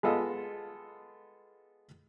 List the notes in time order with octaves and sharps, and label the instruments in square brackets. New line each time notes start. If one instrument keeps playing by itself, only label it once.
[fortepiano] G#3 B3 F4 A4 D#5